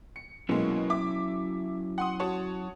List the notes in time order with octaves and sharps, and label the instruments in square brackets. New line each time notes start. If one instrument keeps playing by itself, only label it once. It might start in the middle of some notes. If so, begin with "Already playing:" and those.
[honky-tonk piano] C#7
[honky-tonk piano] B2 G#3 A#3 [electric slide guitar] F#3 C#4 E4
[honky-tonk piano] E5 D6
F#5 C6 D#6
F#4 C#5 A5